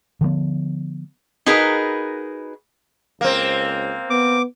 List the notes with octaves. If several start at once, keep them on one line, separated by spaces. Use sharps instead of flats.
D3 F3 G#3 B3
D#4 F#4 G#4 A#4 B4
C#2 A#3 C4
B3 D6